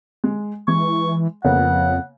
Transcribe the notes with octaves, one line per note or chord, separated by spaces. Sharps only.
G#3
E3 G#3 C#6
F2 C#3 A#3 B3 F#5